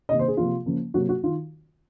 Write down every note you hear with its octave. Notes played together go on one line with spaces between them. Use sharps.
C3 D#3 A#3 D#5
C5
G#4
C3 F3 A#3 F4
C#3 F3 A#3
C3 F#3 A#3 F#4
F#4
D#3 F4